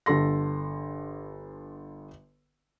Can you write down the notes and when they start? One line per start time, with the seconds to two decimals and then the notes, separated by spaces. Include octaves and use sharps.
0.06 G1 D3 A4 C6 A#6